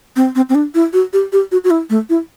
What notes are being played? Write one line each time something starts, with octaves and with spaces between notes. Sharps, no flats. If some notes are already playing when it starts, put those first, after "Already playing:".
C4
C4
C4
D4
E4
F#4
G4
G4
F#4
F#4
E4
A3
E4